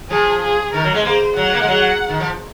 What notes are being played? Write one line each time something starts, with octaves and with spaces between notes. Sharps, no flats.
F3 G#4
G#4
D#3 A#4
F#3
G#3
A#3 C5
F#3 F#5
A#3
G#3
F#3
D#3
F3